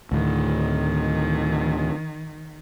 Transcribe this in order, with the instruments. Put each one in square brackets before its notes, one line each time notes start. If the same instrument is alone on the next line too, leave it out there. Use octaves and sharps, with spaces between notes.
[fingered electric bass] D2 A2 [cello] D#3